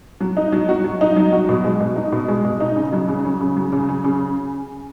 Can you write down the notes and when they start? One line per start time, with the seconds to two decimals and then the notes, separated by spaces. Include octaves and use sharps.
0.21 F#3
0.37 D#4
0.52 F#3
0.69 F#4
0.84 F#3
1.01 D#4
1.16 F#3
1.32 F#4
1.49 B2
1.65 G#3
1.80 B2
1.96 D#4
2.12 B2
2.28 G#3
2.45 B2
2.60 D#4
2.76 C#3
2.93 F#3
3.08 C#3
3.25 C#4
3.41 C#3
3.57 F#3
3.73 C#3
3.89 C#4
4.04 C#3